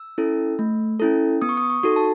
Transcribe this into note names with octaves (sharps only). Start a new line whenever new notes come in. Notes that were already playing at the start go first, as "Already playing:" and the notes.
Already playing: E6
C#4 E4 A4
A3
C#4 E4 A4
B3 D#6
C#6
D#6
C#6
D#4 F#4 A4
A5